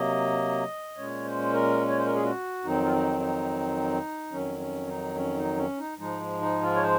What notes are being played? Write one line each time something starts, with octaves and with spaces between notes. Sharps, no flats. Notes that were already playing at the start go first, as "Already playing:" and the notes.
Already playing: C3 F#3 A#3 D#5
A#2 G#3 C#4 C#5
C5
A#4
C#5
C5
A#4
G#4
F#4
F2 D#3 F#3 C4 D#4
F4
D#4
D#4
F2 D#3 F#3 C#4
C#4
D#4
C#4
D#4
C#4
D#4
G#2 F3 G#3 D#4
D#4
F4
C#5
C5